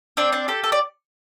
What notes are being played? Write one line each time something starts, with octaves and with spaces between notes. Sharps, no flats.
C4 D4 D5
D4 D5
G4 A4
A4
D5